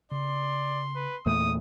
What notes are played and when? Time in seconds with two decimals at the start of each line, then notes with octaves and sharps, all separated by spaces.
0.12 C#3 D5 C6
0.95 B4
1.26 E2 A#2 A3 D#6